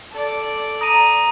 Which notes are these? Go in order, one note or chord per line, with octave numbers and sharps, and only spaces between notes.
A4 D5
A#5 D#6 D#7